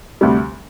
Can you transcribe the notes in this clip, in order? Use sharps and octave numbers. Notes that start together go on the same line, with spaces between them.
D2 C3 G3